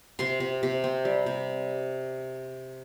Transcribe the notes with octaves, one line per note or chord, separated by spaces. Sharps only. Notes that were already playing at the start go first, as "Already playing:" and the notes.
C3 C6
C3
C3
C4
G3
C3